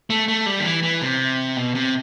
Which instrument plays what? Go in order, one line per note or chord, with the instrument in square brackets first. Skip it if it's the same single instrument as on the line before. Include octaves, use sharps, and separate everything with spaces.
[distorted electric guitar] A3
A3
G3
D#3
E3
E3
C3
B2
C3